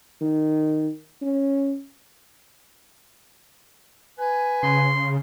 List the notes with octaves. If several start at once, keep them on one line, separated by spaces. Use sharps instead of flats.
D#3
C#4
B4 G#5
C#3 C6